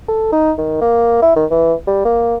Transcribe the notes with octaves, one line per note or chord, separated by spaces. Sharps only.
A4
D#4
D#3
A#3
E4
D#3
E3
G3
A#3